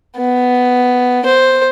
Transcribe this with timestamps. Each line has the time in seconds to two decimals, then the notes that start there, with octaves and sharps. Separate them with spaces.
0.17 B3
1.25 C5